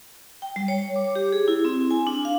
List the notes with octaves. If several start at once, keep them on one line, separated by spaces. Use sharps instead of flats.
G5
G3
C#5
D6
G4
G#4
E4
C4
G#5
D4
F5